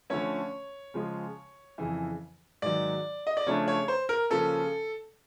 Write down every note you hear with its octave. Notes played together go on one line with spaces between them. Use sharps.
D3 F3 A3 C#4 C#5
C#3 F3 G#3
F2 C#3 E3
G#2 D#3 F#3 D5
D#5
D5
C#3 F3 A3 D4 C#5
C#5
C5
A#4
C#3 F3 A#3 C#4 A4